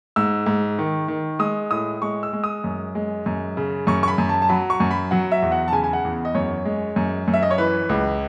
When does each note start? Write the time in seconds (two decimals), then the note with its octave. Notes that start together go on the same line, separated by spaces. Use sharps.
0.16 G#2 E6
0.46 G#2
0.79 D#3
1.08 D#3
1.39 G#3 D#6
1.71 A2 D#6
2.02 G#3 C#6
2.23 E6
2.33 G#3
2.44 D#6
2.64 F#2
2.95 G#3
3.26 F#2
3.57 C#3
3.87 F#2 C#6
4.03 C#6
4.08 B5
4.18 F#2
4.29 A5
4.42 A5
4.49 F#3 B5
4.70 C#6
4.80 F#2
4.91 B5
5.11 F#3 F#5
5.32 E5
5.42 E2
5.52 F#5
5.68 A5
5.72 C#3 G#5
5.84 G#5
5.93 F#5
6.05 E2
6.25 D#5
6.35 F#2 C#5
6.65 G#3
6.96 F#2
7.28 F#2
7.34 E5
7.43 D#5
7.51 C#5
7.58 E3 B4
7.89 C#2